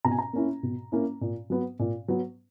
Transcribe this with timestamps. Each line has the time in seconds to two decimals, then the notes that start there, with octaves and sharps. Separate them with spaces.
0.05 B2 A#5
0.11 G#5
0.19 A#5
0.33 A#3 C#4 E4
0.63 B2
0.92 A#3 C#4 E4
1.21 A#2
1.50 F#3 B3
1.79 A#2
2.08 F#3 B3